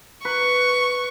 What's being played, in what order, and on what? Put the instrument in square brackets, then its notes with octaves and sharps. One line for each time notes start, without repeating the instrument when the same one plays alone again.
[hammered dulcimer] B4 [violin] C#6